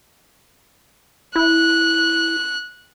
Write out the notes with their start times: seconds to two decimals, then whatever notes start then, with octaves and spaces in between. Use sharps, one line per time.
1.36 E4 F#6